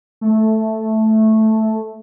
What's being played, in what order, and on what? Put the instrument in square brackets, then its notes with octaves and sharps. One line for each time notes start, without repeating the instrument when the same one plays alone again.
[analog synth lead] A3